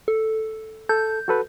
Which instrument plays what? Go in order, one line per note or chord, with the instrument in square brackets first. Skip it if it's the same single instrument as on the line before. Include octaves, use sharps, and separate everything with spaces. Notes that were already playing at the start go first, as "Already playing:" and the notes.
[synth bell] A4
[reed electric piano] A4 [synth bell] G6
[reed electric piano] F#4 A4 B4